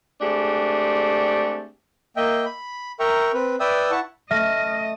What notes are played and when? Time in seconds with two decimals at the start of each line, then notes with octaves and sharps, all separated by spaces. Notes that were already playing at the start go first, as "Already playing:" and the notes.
0.21 G#3 A3 C4 D4 G4 G#4
2.16 A#3 D#5 E5 G5
2.45 B5
3.00 A#4 E5 G5 A#5 C#6
3.33 C4 B4
3.60 B4 D5 E5 G5 D#6 E6
3.91 E4 F#5 A5 C#6
4.31 A3 D#5 E5 F6 A#6